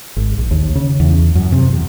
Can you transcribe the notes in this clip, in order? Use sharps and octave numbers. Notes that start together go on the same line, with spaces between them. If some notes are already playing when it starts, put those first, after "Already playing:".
G#1
A#1
D#2
C#3
E2
F#2
C3
E2